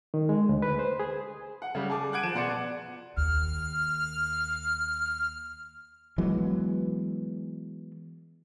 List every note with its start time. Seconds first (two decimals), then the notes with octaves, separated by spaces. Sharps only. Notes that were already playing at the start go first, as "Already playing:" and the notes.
0.14 D#3
0.29 G#3
0.49 D2
0.62 B4
0.79 C5
1.00 G#4
1.62 F#5
1.75 C#3 G3
1.90 G#4 A5 D6
2.12 F#5 F#6 G#6 D7 D#7
2.23 F3 E7
2.35 B2 D5 F#5 C6 C#7
3.17 D#2 F6
6.18 E3 F#3 G#3 B3